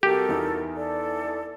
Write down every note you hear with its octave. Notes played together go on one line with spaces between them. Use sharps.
C2 F#4 G4 A4 A#4
E2 D#4
A4 D5